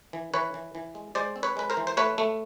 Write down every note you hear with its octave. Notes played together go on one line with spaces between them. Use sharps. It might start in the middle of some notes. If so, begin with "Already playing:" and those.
E3
E3 B4 C#5
E3
E3
G#3
G#3 C5 D5
C4
B4 C#5
G#3 B4
A#4 C5
E3
C5
A3 B4 C#5
A3